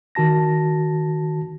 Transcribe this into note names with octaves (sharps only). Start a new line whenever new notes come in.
D#3 F#4 A5 A#6